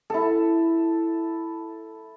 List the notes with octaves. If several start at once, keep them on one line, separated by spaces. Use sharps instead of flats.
E4 A4